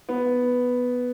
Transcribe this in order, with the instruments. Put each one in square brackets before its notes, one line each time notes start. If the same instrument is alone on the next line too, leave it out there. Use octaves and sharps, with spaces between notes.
[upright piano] B3